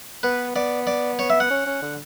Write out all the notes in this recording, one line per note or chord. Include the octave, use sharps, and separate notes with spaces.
B3 B4
B3 D5
D5
C#5
E5
F#5
C#4
C#4
D3